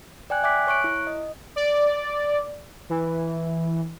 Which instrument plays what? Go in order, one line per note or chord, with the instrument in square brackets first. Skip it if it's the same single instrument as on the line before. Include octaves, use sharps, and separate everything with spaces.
[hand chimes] D5 G5 G#5 F#6
E5 G#5 D6 F#6 B6
C#5 C#6 F#6 D7
E4
D#5
[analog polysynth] D5
E3